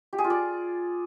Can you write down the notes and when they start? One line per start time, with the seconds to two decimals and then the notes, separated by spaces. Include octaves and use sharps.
0.13 G4
0.18 G#4
0.24 F4
0.30 D5